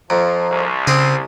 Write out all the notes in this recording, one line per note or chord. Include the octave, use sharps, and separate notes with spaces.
F2 F3 A#5
C2
C#3 C4 G#4